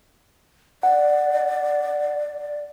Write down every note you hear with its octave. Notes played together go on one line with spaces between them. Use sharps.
D5 F#5